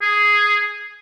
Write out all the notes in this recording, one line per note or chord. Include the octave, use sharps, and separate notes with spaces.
G#4